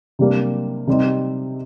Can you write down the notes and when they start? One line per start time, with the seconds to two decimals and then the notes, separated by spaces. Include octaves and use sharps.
0.19 C3 G3 A#3 D4
0.87 C3 G3 C4 D#4